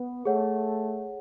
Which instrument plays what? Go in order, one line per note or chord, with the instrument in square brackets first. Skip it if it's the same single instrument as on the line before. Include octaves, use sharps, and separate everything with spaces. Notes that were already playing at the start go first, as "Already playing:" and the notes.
Already playing: [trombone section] B3
[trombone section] A3 [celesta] G#4 C#5 F#5